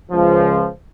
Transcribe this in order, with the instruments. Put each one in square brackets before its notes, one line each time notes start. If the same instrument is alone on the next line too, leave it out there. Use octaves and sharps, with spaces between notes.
[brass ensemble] C#2 F3